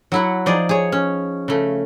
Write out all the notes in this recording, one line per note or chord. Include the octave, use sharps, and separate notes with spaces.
F#3 E4 F#5
F3 D#4 G#4 D5
G#4 C#5
C#4
C#3 A3